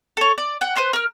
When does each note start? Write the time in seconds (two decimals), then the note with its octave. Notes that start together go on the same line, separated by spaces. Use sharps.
0.17 A4 C#5
0.38 D5
0.61 F#5 G5
0.76 B4 C5 C6 F#6
0.93 A#4 F6